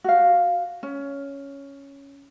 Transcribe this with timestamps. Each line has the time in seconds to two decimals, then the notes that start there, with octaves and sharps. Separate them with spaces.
0.04 F#4 F5
0.83 C#4